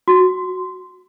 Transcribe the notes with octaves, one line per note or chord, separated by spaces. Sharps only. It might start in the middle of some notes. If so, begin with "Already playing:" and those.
F#4